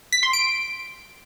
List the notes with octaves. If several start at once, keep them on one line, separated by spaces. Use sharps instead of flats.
B6
C6
D7